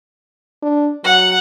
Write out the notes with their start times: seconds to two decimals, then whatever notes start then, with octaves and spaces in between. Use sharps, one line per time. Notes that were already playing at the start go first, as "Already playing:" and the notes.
0.63 D4
1.04 F#3 F#5